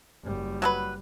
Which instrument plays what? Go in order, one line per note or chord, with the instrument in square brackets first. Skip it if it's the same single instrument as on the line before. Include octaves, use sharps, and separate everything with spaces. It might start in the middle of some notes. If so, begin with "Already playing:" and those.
[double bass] F#1 G3
[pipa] F#3 A4 B4